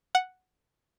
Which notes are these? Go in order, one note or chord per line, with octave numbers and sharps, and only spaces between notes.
F#5